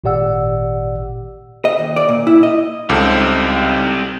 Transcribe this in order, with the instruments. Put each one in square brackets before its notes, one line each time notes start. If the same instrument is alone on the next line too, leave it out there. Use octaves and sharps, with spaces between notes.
[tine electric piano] G#1 A#2 G4 D5 F#5 E6
[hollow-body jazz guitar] D#5
D#2
D5
A#2
E4
D#5
[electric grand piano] C#2 [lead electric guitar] G3 C4 [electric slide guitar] D#4 A4